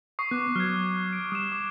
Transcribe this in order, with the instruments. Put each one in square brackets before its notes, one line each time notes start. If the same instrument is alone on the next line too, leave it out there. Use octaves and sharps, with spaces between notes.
[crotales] C#6 D#6 C7
[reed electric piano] B3 [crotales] D6 F#6
[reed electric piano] F#3 [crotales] F6 G#6
[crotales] D7
[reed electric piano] G3 [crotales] D#6 E7
[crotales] D6